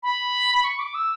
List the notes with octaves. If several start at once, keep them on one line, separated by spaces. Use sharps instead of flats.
B5
C#6
D6
E6